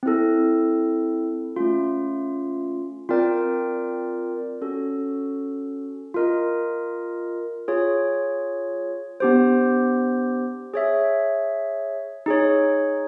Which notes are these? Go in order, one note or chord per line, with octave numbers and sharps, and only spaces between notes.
C4 E4 A4
A3 C#4 F4
C4 F4 A#4 D5 G5
C#4 F#4 A4
F4 A#4 D#5
F4 G#4 C#5
B3 D4 G4 C5
G#4 C#5 E5
D#4 G#4 C#5